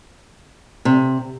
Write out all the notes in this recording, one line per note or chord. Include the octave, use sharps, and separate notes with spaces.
C3